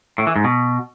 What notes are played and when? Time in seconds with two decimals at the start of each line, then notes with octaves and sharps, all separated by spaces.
0.18 A2
0.27 E3
0.36 G#2
0.44 B2